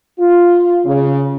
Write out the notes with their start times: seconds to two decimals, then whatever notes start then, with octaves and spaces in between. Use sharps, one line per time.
0.19 F4
0.85 C#3